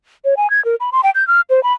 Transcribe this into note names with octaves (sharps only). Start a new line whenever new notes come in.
C#5
G#5
G#6
A#4
B5
C6
G5
G6
F6
C5
B5